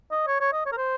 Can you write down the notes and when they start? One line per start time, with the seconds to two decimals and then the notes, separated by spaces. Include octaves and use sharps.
0.11 D#5
0.27 C#5
0.40 C#5
0.52 D#5
0.66 C#5
0.72 A#4
0.77 C5